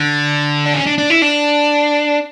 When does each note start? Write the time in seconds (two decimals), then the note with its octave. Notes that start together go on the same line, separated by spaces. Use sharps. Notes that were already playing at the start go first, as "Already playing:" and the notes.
Already playing: D3
0.66 D4
0.74 C#4
0.86 D4
0.98 D4
1.10 E4
1.22 D4